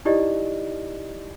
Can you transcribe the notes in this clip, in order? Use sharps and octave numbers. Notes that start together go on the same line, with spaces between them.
D#4 E4 G4 D5 D#5